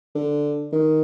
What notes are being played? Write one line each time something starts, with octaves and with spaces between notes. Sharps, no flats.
D3
D#3